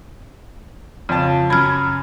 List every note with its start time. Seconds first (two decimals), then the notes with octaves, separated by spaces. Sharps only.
1.09 F2 C#3 A5
1.50 F#2 B5 F6 G#6